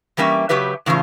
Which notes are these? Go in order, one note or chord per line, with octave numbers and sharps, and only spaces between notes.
E3 G3 A#3 C#4 E5
C#3 F#3 G4 B4 E5
A2 C#3 E3 C#4 F4